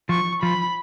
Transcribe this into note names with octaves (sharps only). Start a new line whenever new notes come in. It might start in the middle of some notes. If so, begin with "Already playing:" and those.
F3 C#6
F3 B5